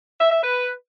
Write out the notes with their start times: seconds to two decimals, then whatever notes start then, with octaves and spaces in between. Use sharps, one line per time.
0.20 E5
0.31 E5
0.42 B4